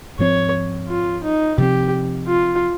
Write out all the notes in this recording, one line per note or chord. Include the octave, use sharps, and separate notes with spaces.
G#2 F3 C4 C#5
F4
D#4
C3 F3 C4 G4
F4